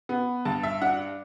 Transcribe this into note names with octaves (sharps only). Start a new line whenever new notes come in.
B3
G2 A5
E5
D4 F#5